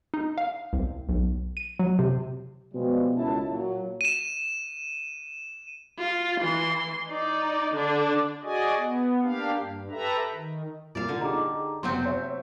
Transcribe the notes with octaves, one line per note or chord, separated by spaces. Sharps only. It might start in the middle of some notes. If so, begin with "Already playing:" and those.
D#4
F5
C2
B1
D#7
F#3
C3
B2 F3 G3 G#3
C#2 F#2 E4 A5
A#2 F#3
D#7 E7
F4
E3 C6
D#4 D5
D3 D4
F#4 G#4 D5 D#5 G#5
B3
A#3 D4 G4 F5
G2
G4 A4 B4 E5 A#5
D#3
C2 A#2 D5 F5
D3
D#4 G4 G#4 A#5 D6
F#1 C3 F#3 B3 C4 C6 G6
C5 C#5 E5